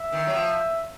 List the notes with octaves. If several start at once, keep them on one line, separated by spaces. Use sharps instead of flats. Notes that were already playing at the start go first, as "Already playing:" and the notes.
Already playing: E5
D#3
F#3
F3